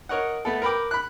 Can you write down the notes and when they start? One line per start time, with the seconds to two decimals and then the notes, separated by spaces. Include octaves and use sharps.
0.09 A#4 C#5 D#5 F#5
0.45 A3 B3 A4
0.62 A#4 B4 G5 D6
0.91 B5 F#6